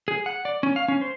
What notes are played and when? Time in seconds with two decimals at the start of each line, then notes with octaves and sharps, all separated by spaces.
0.08 G#4
0.26 F#5
0.45 D5
0.63 C#4
0.76 F5
0.88 C#4
1.01 C5